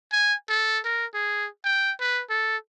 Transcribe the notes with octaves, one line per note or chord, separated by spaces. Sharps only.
G#5
A4
A#4
G#4
G5
B4
A4